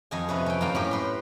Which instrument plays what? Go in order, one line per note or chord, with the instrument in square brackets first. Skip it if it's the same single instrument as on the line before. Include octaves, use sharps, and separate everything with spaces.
[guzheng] F2 D#5 G#5
C3 C#4 B4
C#4 G5
F#2 A#3 F5 G5
A2 C#4 G4
B4 C6